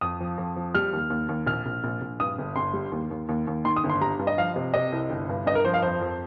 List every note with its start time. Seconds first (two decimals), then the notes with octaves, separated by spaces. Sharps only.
0.01 F2 D#6
0.20 F3
0.38 F2
0.56 F3
0.74 G3 F6
0.93 D#2
1.10 D#2
1.29 D#2
1.47 A#1 F6
1.66 A#1
1.84 A#1
2.02 A#1
2.20 G2 D#6
2.38 G1
2.56 G1 C6
2.74 G3
2.92 D#2
3.11 D#2
3.29 D#2
3.47 D#2
3.65 D#3 C6
3.76 D#6
3.84 G1
3.90 C6
4.01 G3 A#5
4.19 G2
4.27 D#5
4.37 F3 F5
4.56 C3
4.74 C3 D#5
4.92 C2
5.10 G1
5.29 G2
5.46 G2 D#5
5.55 A#4
5.65 F3 C5
5.74 F5
5.82 F2 C5
6.01 F2